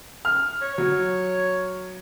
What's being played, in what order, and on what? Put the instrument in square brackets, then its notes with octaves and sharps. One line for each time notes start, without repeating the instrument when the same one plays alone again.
[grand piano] F6
[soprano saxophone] C#5
[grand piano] F#3